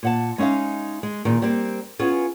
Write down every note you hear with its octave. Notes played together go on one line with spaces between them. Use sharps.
A#2 F#5 A5
G#3 C#4 D#4 E5 F5
G#3
A#2 D#3 G#4
G3 A#3 C4
B3 C#4 F4 G#4